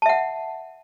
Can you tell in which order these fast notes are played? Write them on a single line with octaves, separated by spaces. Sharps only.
A5 E5 F#5